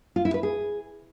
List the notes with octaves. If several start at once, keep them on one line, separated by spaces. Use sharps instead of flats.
F4
E4
B4
G#4